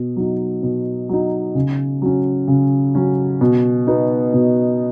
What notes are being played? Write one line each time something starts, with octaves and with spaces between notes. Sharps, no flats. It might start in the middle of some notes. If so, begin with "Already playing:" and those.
Already playing: B2
F#3 D#4
B2
F#3 D#4
C#3
F#3 C#4
C#3
F#3 C#4
B2
B3 D#4
B2